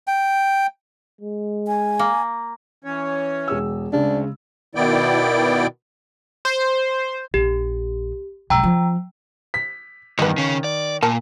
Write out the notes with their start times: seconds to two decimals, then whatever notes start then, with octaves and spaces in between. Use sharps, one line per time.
0.07 G5
1.21 G#3
1.67 G#5
1.99 A#3
2.84 E3 C#4 C#5
3.48 E1 G#4 E6
3.93 D2 C#3 G#3 D4
4.75 B2 D#3 B3 E4 D5 G5
6.45 C5
7.34 A#1 G4
8.50 B1 G#2 G5 A#5 E6
8.63 F3 C4
9.54 B6
10.19 E2 G2 D#3 B4 D#5
10.38 C#3 C#4
10.64 D5
11.02 A#2 A#4 A5